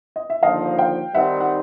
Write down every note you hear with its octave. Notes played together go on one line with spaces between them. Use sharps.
D#5
E5
D#2 D3 F3 D#5 F5
F5 G5
D#3 G3 C4 D#4 E5 F#5
F#5